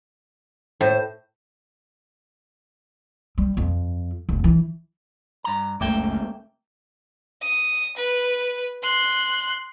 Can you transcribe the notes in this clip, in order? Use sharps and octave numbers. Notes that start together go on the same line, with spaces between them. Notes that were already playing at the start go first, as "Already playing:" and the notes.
A2 C5
G3
F2
F1
E3
G2 A#5
F#1 C#2 A3 A#3 E5 G5
D#6
B4
C6 F#6